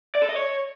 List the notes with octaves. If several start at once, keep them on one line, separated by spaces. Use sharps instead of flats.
D5
A4
D#5
C#5